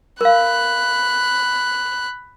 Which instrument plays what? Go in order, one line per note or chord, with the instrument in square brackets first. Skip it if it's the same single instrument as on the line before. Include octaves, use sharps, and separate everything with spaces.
[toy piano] A#4 F5 [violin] B5 F#6